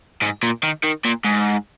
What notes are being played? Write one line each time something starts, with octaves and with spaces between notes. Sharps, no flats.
G#2
A#2
D#3
D#3
A#2
G#2